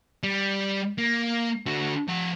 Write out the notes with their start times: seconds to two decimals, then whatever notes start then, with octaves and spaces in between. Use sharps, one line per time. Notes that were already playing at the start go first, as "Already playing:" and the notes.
0.23 G3
0.98 A#3
1.66 D3 F#4
2.08 F3 F#5